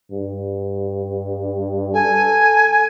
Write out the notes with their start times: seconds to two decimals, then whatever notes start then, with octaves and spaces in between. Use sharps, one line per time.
0.11 G2
1.94 A4 G#5